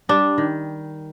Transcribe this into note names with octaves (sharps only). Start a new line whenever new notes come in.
G3 D4
D#3